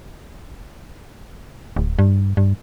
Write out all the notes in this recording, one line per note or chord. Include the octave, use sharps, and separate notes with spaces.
D1
G2
G2